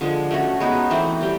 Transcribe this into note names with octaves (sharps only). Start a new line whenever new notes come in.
D3 F3 G#3
A3 C#4 F#4
G#3 B3 D#4 F#4
E3 A3 C4
G3 C4